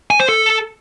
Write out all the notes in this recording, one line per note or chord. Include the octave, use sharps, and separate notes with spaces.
G#5
C5
A4